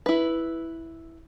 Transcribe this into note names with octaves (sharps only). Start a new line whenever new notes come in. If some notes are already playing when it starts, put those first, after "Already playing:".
E4 B4